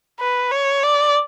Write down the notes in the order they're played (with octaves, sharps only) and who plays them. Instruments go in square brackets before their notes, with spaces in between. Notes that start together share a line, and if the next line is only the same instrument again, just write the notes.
[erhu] B4
C#5
D5